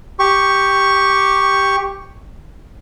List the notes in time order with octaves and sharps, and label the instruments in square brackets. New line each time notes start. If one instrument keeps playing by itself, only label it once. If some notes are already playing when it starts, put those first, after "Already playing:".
[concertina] G4 C#6